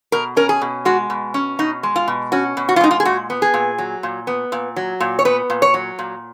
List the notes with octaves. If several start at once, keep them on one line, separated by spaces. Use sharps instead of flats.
B2 A#4
C#4 A#4
G#4
B2
G#3 F#4
B2
C#4
B2 D#4
G#3
F4
B2
C#4 F#4
B2
F#4
F4
G#3 D#4
F4
G#4
A#2 F#4
B3
G#4
A#2
F#3
A#2
B3
A#2
F#3
A#2
C#5
B3 B4
A#2
C#5
F#3
A#2